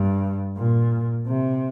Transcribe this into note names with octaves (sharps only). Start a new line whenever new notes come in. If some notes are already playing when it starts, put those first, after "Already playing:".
Already playing: G2
A#2
C3